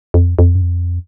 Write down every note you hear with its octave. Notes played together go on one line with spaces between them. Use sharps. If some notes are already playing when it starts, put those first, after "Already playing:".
F2
F2
F#2
F2